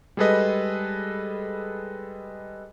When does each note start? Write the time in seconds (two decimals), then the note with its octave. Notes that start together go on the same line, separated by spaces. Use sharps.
0.17 G3 G#3 G#4 A4 B4 D#5